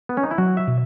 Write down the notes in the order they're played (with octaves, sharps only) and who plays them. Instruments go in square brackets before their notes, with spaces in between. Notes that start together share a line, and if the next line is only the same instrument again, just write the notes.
[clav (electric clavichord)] B3
C#4
D#4
E4
[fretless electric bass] F#3 [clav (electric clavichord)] F#4
[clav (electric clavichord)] E5
[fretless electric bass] B2